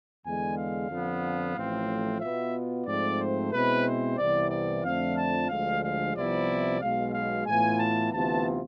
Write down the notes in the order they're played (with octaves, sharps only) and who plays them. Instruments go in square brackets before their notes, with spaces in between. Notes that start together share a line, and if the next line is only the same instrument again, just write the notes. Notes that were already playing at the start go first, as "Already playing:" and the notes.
[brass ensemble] E2 D3 G#3 G#5
F5
F2 D3 F3 B3
A1 A2 F3 A3 C4
B2 B3 F4 E5
G#2 F3 A3 C4 D5
C5
B2 G#3 C4 E4 B4
C5
C2 C3 E3 B3 D5
D5
F2 D3 F3 A3 D4 F5
A5
D2 D3 F3 G#3 F5
F5
C2 C3 F3 B3 E4 D5
B1 B2 G#3 F5
F5
A2 E3 B3 F4 G#5
A5
D2 C3 E3 B3 F4 A5